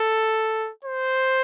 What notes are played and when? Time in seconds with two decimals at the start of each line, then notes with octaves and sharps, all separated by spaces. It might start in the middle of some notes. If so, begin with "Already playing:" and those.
Already playing: A4
0.85 C5